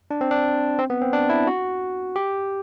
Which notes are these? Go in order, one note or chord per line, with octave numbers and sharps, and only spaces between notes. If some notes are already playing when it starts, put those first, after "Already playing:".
D4
C4
D4
C4
B3
C4
D4
E4
F#4
G4